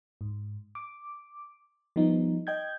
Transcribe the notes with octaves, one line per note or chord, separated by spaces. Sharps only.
G#2
D6
F3 G3 B3 D#4
D#5 G5 G6 G#6